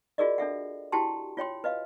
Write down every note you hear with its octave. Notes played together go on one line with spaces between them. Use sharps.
F4 F#4 G#4 A#4 D5 D#5
D4 A4 E5 F#5
E4 F#4 G4 G5 A5 C6
F4 C#5 G5 C6
B4 D#5 F5